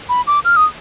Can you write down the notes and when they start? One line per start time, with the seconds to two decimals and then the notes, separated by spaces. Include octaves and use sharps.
0.09 B5
0.27 D6
0.45 F6
0.56 D#6